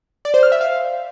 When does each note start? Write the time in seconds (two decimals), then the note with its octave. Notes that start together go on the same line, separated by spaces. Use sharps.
0.25 D5
0.34 C5
0.43 F6
0.52 E5
0.61 F5